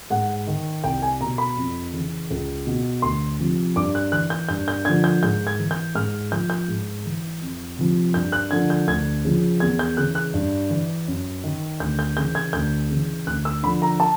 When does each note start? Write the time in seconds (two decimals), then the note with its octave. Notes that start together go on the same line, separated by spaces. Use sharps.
0.10 G#2 F#5
0.47 D#3
0.84 C2 G5
1.02 G#5
1.21 B2 A#5
1.38 B5
1.57 F2
1.93 C#3 E3
2.30 C#2
2.67 B2
3.02 D2 C6
3.39 C3 F3
3.76 G2 D6
3.95 F#6
4.12 E3 F#6
4.30 G6
4.49 G2 G6
4.68 G6
4.85 D3 F3 G#6
5.04 G6
5.23 G#2 G6
5.47 G#6
5.59 E3
5.71 G6
5.95 G#2 F6
6.32 F3 G6
6.50 G6
6.68 G#2
7.06 E3
7.41 F2
7.78 C3 F3
8.14 G2 G6
8.32 F#6
8.51 D3 F3 G#6
8.70 G6
8.87 D2 G#6
9.25 C#3 F3
9.60 E2 G#6
9.79 G6
9.97 C#3 E3 F#6
10.15 F#6
10.34 G2
10.70 E3
11.08 F#2
11.44 D#3
11.80 D2 G6
11.99 G6
12.17 C#3 E3 G6
12.35 G#6
12.53 D2 G6
12.90 C#3 E3
13.27 D2 F#6
13.45 E6
13.63 D3 F3 B5
13.82 A#5
14.00 A5